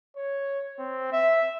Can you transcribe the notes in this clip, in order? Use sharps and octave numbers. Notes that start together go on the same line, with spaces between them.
C#5
C4
E5